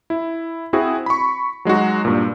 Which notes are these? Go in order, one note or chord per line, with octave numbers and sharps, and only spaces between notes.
E4
C4 E4 F#4 G#4
B5 C#6
F#3 G#3 D#4 F#4
G2 A#2